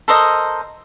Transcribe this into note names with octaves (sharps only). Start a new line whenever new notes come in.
A4 A#4 C5 D#5